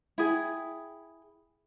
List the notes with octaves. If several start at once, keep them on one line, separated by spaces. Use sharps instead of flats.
E4 G#4 G5